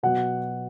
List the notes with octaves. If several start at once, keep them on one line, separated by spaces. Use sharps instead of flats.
B2 F#3 F#5